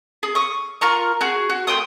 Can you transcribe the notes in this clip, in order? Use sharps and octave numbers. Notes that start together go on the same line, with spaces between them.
G#4
C#6 D#6
F4 A#4 A#5 C#6
F#4 G#4
F#4
A3 G5 C6 D#6